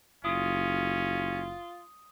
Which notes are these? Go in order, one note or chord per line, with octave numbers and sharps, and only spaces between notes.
F#1 C#4 F4 D#6